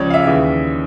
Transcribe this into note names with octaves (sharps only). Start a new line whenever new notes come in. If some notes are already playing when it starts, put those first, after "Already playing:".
Already playing: C#2 C#3 F3 G#3 C#5 D5
F5
E5
D#2 C#3 E3